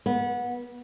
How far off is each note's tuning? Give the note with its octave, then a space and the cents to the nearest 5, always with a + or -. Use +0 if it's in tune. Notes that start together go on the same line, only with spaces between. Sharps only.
B3 -25